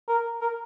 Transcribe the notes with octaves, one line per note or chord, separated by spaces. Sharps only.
A#4
A#4